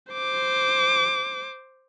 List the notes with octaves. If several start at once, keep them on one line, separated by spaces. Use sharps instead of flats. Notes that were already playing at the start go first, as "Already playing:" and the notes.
C5 D6